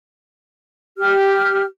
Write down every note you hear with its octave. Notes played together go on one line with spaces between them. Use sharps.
G4 F6